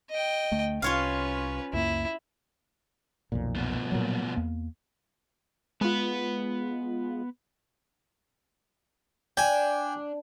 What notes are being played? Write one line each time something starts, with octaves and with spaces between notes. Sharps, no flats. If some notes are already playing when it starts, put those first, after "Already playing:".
D#5 G5
D2 A3
C2 C#4 F4 B4 C#5 F5
C#2 F#2 A#3 E4
B1 F2 A#2
B2 F3
A#2 F#3
E2 A#3
G#3 B3 F4 B4
D4 G5 G#5